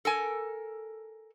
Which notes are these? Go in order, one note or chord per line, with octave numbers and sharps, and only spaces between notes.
A4 A#4 G#5